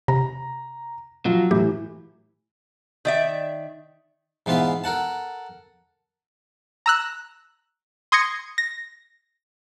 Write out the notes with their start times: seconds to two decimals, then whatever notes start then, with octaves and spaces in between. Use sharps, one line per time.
0.08 C3 A#5
1.25 F3 F#3 F4
1.51 A2 E3 G4
3.05 D#3 D5 E5
4.46 G#2 E3 B3 F4 E5
4.84 A4 A#4 F#5 A5
6.86 A#5 E6 F#6
8.12 C6 D#6 G#6 A#6 C#7
8.58 A#6